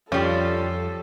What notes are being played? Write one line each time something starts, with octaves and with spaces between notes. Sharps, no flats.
F2 F3 G3 C#4 A4